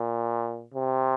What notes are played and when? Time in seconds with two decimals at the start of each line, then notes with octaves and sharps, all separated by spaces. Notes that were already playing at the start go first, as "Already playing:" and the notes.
Already playing: A#2
0.74 C3